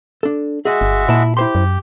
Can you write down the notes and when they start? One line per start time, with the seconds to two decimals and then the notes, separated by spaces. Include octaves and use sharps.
0.23 D4 A4
0.65 G#3 F#4 G#4 D#5 E5
0.81 G1
1.09 A#2 E4 A5
1.37 E4 G4 C5 C6
1.55 F#2